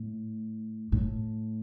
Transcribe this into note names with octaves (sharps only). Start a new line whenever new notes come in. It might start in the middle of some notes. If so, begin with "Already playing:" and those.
Already playing: A2
A2